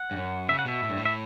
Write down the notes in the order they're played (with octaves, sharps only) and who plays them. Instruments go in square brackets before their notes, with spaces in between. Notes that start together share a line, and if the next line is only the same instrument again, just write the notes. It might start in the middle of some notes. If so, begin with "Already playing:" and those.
Already playing: [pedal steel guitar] F#5
[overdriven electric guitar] G2
F#2
[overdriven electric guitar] C#3 [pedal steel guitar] E5
[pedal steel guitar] F#5
[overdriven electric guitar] B2 [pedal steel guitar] E5
[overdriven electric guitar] A2
G2
A2
[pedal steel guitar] E5